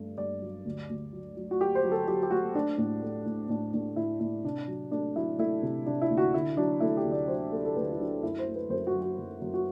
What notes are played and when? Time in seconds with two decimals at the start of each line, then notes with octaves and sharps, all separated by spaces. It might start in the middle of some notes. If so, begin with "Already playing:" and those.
Already playing: G2 A3
0.17 G2 D5
0.42 F#3
0.65 D2
0.89 D2
1.12 F#3
1.36 F#3
1.51 F#4
1.60 F#3 G4
1.75 C5
1.84 F#3
1.91 A4
2.07 F#3 G4
2.23 G4
2.31 A3 F#4
2.55 A3 D4
2.78 A2
3.02 A3
3.26 A2
3.49 A2 D4
3.73 A2 D4
3.96 A2 E4
4.20 A2 E4
4.44 C3 D4
4.68 F#3
4.91 A3 D4
5.15 F#3 E4
5.38 A3 E4
5.62 C3
5.86 C3 D4
6.02 E4
6.10 D2
6.17 F#4
6.34 D3 E4
6.57 F#3 D4
6.80 A3 E4
6.97 G4
7.05 D2
7.12 D5
7.28 F#3 C5
7.52 A3 A4
7.65 A4
7.76 D2 B4
7.92 E4
8.00 F#3 D4
8.23 F#2 E4
8.39 C5
8.47 A3
8.55 B4
8.70 F#2 C5
8.87 F#4
8.93 F#3
9.02 F#4
9.18 F#2
9.42 F#2
9.54 F#4